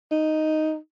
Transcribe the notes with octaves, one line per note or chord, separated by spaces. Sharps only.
D#4